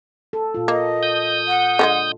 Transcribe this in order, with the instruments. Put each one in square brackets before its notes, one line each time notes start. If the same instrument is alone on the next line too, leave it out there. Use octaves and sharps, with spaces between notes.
[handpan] A4
A#2 F4
[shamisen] A#3 [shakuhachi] D#5
[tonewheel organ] D#6 G6
[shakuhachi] F#5
[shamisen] D3 F3 G#3